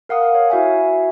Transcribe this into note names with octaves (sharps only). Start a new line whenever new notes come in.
A#4 F5 F#5 D#6
C#5
E4 F#4 E5 G#5